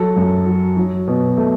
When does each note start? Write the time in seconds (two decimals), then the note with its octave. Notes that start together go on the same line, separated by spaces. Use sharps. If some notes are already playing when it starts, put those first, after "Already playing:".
Already playing: F#3 A4
0.16 F#2
0.46 F#3
0.77 F#3
1.07 B2
1.37 A3